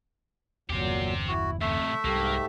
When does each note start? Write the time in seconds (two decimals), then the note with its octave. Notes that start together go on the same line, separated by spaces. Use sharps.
0.70 G1 E2 A#2 F#3 C4 G4
1.28 E4 F#4
1.61 F2 A2 C3 A3 E5
2.05 C2 G#2 F#3 G3 A#3 G4 A4